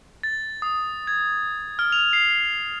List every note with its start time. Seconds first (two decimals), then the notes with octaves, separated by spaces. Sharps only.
0.23 A6
0.62 D#6
1.07 G#6
1.79 F6
1.92 F7
2.13 C7